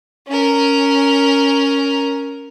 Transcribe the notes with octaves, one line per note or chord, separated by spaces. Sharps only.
C#4 A#4